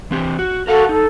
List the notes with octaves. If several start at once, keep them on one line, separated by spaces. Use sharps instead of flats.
E3 C4 G4
F#4
F#4 A4 A#4 F5 F#5
D#4 A4